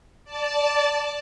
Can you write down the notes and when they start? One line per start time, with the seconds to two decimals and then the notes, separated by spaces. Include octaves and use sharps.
0.25 D5 A5